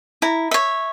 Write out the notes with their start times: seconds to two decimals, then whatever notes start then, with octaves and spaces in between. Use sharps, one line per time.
0.22 E4 A#5
0.51 C#5 E5